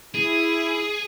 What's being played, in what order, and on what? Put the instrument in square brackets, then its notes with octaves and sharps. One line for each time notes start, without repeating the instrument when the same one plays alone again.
[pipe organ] E4 [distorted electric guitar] G#4